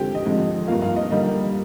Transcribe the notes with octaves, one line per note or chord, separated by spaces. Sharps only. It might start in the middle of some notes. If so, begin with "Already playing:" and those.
Already playing: D3 F3 G#3 C4 G4 G5
D#5
F2 D3 F3 G#3
G2 F3 A#3 F4 F5
F4 F5
D#5
D3 G3 A#3 D#5